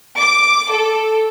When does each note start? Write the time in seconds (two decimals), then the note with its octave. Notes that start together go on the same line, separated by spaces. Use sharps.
0.18 D6
0.71 A4